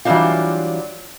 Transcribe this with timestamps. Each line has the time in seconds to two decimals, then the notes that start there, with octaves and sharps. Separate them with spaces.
0.05 E3 F#3 G3 D4 D#4 F4